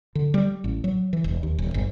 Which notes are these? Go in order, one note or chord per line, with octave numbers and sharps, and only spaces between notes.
D3
G3
A1
F#3
E3
E1
D#2
D#1
G1